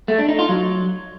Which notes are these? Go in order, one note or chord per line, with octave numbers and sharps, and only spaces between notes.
A3
D4
D#4
F4
F#3